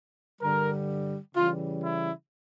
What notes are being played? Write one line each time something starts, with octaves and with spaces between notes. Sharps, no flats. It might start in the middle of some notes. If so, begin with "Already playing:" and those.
G2 D3 G3 A#4
C#3 E3 G3 F4
E4